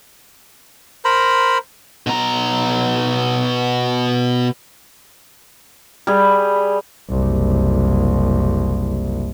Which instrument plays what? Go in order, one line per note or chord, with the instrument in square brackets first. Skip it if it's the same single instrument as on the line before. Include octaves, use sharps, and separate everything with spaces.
[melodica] A#4 C5 A#5 B5
[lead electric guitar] B2 A#5
[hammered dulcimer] G3 G#4
[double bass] F#1 C2